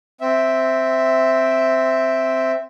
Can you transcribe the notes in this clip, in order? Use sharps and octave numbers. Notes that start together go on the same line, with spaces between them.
C4 E5